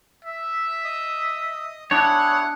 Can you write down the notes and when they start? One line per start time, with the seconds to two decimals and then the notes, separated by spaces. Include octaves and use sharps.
0.24 E5
0.84 D#5 D#6
1.91 D4 E4 G#4 C#5 F#5